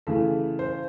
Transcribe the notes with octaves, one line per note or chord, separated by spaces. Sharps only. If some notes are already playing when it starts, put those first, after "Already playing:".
C#3 E3 A3
C5